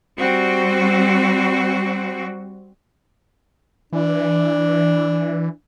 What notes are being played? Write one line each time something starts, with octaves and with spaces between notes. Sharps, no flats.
G3 C4 F#4
E3 D4